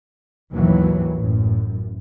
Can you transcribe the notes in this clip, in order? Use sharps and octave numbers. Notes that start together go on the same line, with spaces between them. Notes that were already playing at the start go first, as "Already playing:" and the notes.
G#1 D#2 B2 E3 F#3
A1 F#2